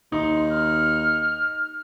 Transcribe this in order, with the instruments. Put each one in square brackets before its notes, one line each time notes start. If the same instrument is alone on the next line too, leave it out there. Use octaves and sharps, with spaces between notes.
[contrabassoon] D#2 [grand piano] D#4 [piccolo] C6
[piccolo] F6